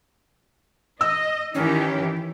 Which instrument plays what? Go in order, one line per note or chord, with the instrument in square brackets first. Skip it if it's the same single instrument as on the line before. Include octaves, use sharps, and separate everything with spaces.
[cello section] D#5 [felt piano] E6
[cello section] D#3 E3 G4 [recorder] C#4